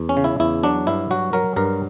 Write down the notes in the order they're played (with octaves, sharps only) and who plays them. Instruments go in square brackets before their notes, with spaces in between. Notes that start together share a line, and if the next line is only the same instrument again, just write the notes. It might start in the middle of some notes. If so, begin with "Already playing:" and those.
Already playing: [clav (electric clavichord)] E2
C#4
C#3
E4
E2 E4
F#3 D4
G2 E4
F#3 F#4
F#3 A#4
G2 A#4